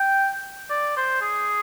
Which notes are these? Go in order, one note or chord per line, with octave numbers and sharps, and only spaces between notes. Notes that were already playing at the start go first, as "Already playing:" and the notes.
Already playing: G5
D5
C5
G#4